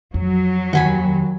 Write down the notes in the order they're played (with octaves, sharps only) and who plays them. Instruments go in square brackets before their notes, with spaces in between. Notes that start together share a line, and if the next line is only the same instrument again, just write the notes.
[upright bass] F2 [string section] F#3
[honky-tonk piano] D#2 [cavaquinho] F#5 G#5 B5